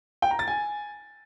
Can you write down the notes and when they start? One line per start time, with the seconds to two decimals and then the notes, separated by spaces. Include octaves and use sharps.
0.22 G5
0.31 A#5
0.39 A6
0.48 G#5